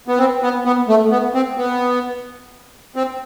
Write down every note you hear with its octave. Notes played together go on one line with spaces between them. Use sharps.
B3
C4
B3
B3
A3
B3
C4
B3
C4